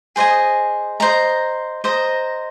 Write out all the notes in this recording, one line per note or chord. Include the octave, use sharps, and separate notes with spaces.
G#4 C5 D#5 G#5
C5 D#5 A#5
C5 D#5 A#5